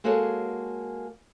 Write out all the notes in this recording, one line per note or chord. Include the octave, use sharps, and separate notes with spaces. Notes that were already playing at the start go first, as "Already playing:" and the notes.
G#3 A#3 F#4 G#4 A4 C#5